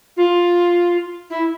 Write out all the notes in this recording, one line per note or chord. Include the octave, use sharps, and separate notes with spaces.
F4
E4